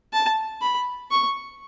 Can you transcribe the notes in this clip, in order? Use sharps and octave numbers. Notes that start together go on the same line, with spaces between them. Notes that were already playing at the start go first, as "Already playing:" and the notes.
A5
B5
C#6